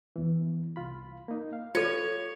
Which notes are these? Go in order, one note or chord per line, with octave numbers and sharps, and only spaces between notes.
E2 E3
C2 F4 B5
A#3 D#4
F5
F4 A4 C#5